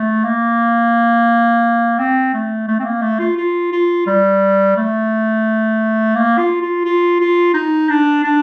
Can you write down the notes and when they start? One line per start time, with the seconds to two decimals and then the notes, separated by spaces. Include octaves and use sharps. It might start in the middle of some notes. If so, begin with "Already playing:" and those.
Already playing: A3
0.24 A#3
1.99 C4
2.33 A3
2.68 A3
2.79 C4
2.85 A#3
3.02 A3
3.19 F4
3.36 F4
3.72 F4
4.06 G3
4.76 A3
6.15 A#3
6.38 F4
6.61 F4
6.85 F4
7.20 F4
7.54 D#4
7.89 D4
8.24 D4